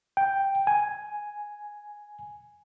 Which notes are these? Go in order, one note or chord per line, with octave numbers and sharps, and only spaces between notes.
G5
G#5